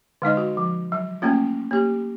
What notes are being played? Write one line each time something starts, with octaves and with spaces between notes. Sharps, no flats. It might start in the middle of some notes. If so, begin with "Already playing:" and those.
D3 G#3 D#4 D#5
F#4
F3
F#3
A3 A#3 C#4 F4
A#3 G4